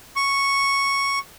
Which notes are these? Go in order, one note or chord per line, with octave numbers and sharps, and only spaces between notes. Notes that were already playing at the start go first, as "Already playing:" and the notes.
C#6